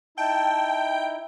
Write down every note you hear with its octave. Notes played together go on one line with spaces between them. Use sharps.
D#4 E4 G5 A5